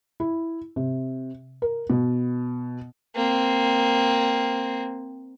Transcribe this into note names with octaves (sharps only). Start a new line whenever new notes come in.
E4
C3
A#4
B2
A#3 C4